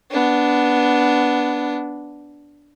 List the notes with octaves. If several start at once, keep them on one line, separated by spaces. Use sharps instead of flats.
B3 D4